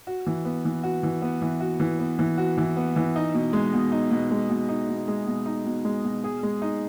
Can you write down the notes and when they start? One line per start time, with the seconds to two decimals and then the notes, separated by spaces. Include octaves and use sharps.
0.07 F#4
0.27 E3
0.45 B3
0.65 E3
0.83 F#4
1.03 E3
1.22 B3
1.42 E3
1.60 F#4
1.80 E3
1.99 B3
2.19 E3
2.38 F#4
2.58 E3
2.77 B3
2.96 E3
3.16 D#4
3.34 B2
3.53 G#3
3.73 B2
3.92 D#4
4.11 B2
4.31 G#3
4.49 B2
4.69 D#4
4.89 B2
5.08 G#3
5.27 B2
5.46 D#4
5.65 B2
5.85 G#3
6.04 B2
6.24 G#4
6.43 G#3
6.62 D#4